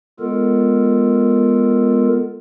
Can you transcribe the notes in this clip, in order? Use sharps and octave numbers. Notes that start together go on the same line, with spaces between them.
G#3 B3 F4 A4 A#4